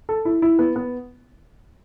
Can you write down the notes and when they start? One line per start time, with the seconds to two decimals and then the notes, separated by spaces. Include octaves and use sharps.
0.09 A4
0.25 E4
0.42 E4
0.59 B3
0.76 B3